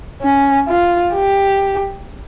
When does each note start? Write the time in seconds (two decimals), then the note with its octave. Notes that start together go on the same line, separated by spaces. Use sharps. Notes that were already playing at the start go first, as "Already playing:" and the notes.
0.22 C#4
0.68 F4
1.14 G4